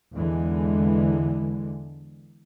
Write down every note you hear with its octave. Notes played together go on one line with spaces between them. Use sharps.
E2 D3 E3 G#3